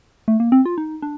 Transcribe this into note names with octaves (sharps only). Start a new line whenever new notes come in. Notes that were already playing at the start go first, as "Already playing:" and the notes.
A3
A#3
C4
F4
D#4
D4